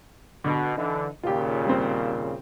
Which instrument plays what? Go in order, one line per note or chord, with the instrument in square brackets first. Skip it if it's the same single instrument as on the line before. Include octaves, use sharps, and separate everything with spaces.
[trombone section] B2 [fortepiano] D3
[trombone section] D3 E3 [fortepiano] D#4
[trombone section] D#2 A#2 C#3 [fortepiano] F4 G4
[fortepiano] G3 C4